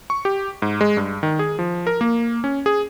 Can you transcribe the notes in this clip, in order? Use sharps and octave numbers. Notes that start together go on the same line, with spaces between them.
C#6
G4
G#2
G#3
G2
D#3
G#4
F3
A#4
A#3
C#4
G#4